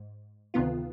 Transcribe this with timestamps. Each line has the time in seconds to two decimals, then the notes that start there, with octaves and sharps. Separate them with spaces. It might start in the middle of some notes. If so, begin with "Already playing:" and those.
Already playing: G#2
0.54 D2 C3 D#3 B3 F4